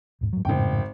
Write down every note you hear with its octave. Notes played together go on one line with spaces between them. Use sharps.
D#1 G#2
G#2 F#3
G#1 F2 A2 C#3 G5